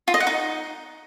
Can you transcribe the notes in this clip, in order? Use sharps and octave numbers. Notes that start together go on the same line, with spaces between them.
F4
D#5
F#5
D#4